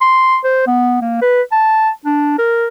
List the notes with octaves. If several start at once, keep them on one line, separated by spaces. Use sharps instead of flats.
C6
C5
B3
A#3
B4
A5
D4
A#4